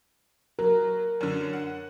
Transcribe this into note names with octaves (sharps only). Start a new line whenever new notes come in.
F#3 A#4
F#2 D3
F#5